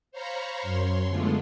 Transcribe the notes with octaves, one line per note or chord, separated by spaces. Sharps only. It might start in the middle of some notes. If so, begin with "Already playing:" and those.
C5 C#5 F5 A#5 B5 C#6
F#2 C#5 C6
D3 G#3 A3 B3 D4 F4